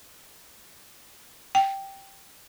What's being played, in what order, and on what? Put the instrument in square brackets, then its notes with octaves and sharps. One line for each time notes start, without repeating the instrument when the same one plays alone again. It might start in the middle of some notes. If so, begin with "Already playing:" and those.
[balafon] G5